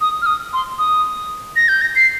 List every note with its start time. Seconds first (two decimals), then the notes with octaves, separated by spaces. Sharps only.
0.01 D#6
0.22 F6
0.26 D#6
0.53 C6
0.78 D#6
1.56 A#6
1.68 G6
1.81 A#6
1.95 C7